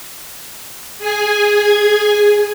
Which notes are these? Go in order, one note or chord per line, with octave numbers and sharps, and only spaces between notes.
G#4 G#5